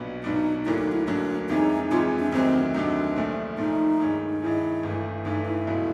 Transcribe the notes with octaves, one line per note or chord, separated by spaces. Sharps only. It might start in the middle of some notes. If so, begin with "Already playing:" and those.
Already playing: B1 A#2 F#3 B3 D4
B1 A#2 F#3 B3 D4 D#4
D2 D3 F#3 A#3 E4
D#4
E4
D2 D3 F#3 A#3 D4
F2 C3 E3 G#3 C#4 D#4
F2 C3 E3 G#3 C#4 F4
D4
D2 C3 D#3 F#3 C4
D2 C3 D#3 F#3 D4
A#1 A#2 F3 A3
A#1 A#2 F3 A3 D#4
G2 D#3 G#3 C#4
D#4
G2 D#3 G#3 C#4 E4
G1 G2 E3 A3
G1 G2 E3 A3 D#4
E4
C#2 B2 F#3 A3